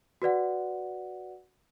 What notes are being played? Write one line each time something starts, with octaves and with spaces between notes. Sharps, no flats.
F#4 B4 D5 F#5